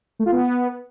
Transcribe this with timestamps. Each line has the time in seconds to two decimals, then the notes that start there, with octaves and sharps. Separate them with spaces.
0.19 A3
0.26 F4
0.32 B3